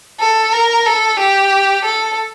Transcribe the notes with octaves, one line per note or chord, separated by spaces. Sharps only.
A4
A#4
A4
G4
A4